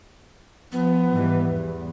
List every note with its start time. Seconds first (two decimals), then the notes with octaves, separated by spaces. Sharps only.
0.72 F3 B3
1.10 G#2 E3 G3
1.47 E2